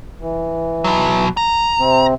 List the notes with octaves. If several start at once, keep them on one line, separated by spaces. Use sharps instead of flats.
E3
B2 F#3
A#5
C3 C4